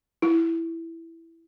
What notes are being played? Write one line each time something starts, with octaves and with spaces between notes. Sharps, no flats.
E4